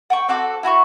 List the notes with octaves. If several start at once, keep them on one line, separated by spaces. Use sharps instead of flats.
F#5 G5 C#6
C4 F#4 A4 D6
E4 F#4 B5 C#6